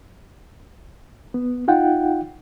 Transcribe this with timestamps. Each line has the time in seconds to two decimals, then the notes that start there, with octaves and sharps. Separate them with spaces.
1.34 B3
1.68 D#4 F4 F#5 G5